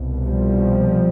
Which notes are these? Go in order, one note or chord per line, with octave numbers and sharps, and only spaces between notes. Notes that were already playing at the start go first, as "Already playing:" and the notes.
Already playing: C2 B2
F3 G3